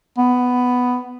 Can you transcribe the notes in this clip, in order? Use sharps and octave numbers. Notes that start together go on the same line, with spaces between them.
B3